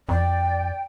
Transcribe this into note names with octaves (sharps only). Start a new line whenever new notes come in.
F2 D5 G5